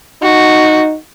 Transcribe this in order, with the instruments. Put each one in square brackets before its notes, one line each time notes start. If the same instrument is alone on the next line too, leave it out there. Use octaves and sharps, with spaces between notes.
[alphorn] D#4 [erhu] F#4